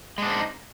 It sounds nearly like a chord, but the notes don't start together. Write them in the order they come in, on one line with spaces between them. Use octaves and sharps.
G#3 D4 C4 D#4